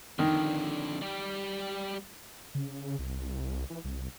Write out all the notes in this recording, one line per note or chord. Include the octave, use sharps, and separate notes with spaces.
F2 D3 D#3
G3 G4
C#3
C2
E3
C2